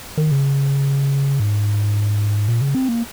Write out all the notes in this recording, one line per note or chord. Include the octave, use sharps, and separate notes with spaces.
D#3
C#3
G#2
A#2
C#3
C4
A#3